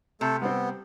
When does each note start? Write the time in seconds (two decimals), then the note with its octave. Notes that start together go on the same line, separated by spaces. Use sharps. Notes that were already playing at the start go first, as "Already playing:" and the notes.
0.21 C3 A3 A4
0.41 G3 B3 C4